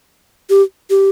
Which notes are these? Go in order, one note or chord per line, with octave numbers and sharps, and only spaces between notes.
G4
G4